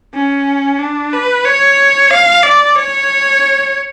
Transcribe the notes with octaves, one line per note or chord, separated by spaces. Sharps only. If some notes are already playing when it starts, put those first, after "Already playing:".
C#4
D4
B4
C#5
F5
D5
C#5